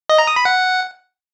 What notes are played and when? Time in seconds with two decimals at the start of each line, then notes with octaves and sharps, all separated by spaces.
0.09 D#5
0.18 A#5
0.27 D#6
0.36 B5
0.45 F#5